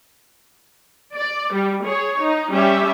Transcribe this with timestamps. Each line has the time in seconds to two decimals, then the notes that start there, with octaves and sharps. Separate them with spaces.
1.15 D5
1.53 G3
1.84 G#4 C#5
2.19 D#4
2.51 G3 C#4 G4 E5